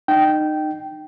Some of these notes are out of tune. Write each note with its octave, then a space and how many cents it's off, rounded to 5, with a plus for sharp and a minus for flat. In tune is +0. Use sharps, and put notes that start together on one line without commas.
D#4 -30 G5 -15